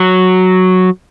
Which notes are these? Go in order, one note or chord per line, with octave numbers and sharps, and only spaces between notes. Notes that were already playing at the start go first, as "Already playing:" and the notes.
Already playing: F#3